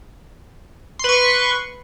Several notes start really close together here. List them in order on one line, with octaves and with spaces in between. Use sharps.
C6 B4 C#6